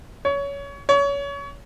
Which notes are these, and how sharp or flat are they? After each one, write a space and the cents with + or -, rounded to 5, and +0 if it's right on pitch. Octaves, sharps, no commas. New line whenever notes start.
C#5 +20
C#5 +25